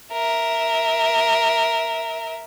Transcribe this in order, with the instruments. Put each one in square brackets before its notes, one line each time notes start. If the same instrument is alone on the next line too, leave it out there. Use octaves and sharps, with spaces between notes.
[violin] A#4 E5